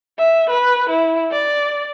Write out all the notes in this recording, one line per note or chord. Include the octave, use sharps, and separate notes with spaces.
E5
B4
E4
D5